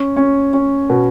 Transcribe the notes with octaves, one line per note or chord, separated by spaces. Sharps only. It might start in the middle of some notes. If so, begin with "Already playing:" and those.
Already playing: C#4
C#4
C#4
B2